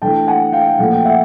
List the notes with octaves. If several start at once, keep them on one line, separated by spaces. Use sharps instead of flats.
E3 A3 D4 G5 A5
F#5 G#5
F5 G5
A#2 F3 A3 F#5
G5
E5 F#5